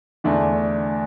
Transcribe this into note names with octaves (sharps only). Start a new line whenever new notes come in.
E2 D3 A3 D4